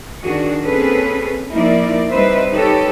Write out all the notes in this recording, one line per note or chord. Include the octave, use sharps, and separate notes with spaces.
D#3 D4 F#4 G#4
A#3 C4 C#4 G#4 A4 B4
F3 A#3 D#4 E4 A#4 D5
G3 C4 D#4 B4 C5 E5
D#4 G4 A4 B4 C#5